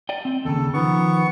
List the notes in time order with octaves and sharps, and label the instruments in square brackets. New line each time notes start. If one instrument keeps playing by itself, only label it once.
[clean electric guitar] D5 D#5 G5
C4 G5
[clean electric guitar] D#2 C#3 [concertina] A4
[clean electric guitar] D3 D#3 F3 [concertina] B3 C#6